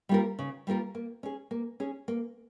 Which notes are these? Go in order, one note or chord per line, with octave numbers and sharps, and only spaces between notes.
G3 A#3 F4 A#4
C#3
G3 A#3 F4 A#4
A#3
C#4 G#4
A#3
C#4 G#4
A#3